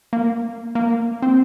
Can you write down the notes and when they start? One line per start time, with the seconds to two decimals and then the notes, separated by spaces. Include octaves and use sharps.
0.13 A#3
0.75 A#3
1.22 C4